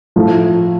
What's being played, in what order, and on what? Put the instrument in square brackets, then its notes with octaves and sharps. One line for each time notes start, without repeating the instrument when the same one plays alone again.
[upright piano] A2 F3 A3